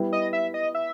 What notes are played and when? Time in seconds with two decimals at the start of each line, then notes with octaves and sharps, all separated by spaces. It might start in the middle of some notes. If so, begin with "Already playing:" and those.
Already playing: G3 B3 E4
0.13 D#5
0.33 E5
0.54 D#5
0.75 E5